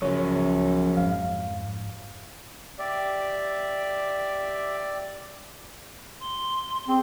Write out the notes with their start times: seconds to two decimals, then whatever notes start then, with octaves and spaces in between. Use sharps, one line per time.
0.02 C#2 F#2 F3 G#4 C#5
0.97 F2 G#2 F5
2.79 G4 D5 E5
6.20 C6
6.88 C4 G#4